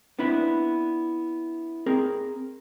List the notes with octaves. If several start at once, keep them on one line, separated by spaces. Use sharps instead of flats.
B3 C4 D4 E4 B4
C4 G#4 A#4